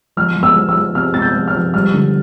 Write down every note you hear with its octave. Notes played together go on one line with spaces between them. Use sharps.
F3 F6
F3
E6
F3
E6
F3
C3 F6
C3 A6
G6
F3
F6
F3
G3 F6
D3